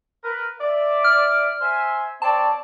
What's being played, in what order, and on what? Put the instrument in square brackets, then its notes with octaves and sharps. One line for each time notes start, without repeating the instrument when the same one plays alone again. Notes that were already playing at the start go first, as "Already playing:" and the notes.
[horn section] A#4 B4
D5 E5
[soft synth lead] F6
[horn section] C5 E5 G#5
[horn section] C4 C#5 D5 [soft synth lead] A5